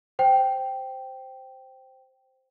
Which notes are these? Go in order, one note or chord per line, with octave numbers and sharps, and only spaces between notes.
C5 G5